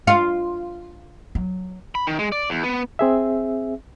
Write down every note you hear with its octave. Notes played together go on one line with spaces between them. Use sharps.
F4
F#3
B5
D#3
G#3
D5
E2
B3
C4 G#4 E5